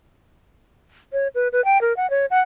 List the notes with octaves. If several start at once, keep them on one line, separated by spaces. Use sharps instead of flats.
C#5
B4
B4
G5
A#4
F#5
C#5
F#5